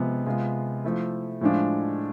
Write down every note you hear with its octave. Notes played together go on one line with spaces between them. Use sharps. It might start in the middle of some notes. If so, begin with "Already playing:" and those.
Already playing: C3 F3 G#3 B3
C3 G#3 B3 F4
F3 A3 E4 A4
A2 F3 G#3 D4 F4